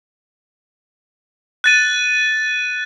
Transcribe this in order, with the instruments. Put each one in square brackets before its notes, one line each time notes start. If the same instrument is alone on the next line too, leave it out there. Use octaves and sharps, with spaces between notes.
[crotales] F#6 A6 D#7